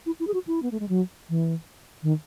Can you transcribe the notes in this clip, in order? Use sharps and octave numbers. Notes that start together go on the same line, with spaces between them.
E4
E4
G#4
F#4
E4
B3
A3
G#3
F#3
E3
D#3